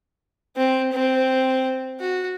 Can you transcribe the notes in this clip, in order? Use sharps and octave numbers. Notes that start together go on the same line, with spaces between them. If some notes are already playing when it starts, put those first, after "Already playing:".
C4
C4
F#4